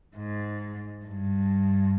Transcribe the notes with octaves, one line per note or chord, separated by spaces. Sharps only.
G#2
G2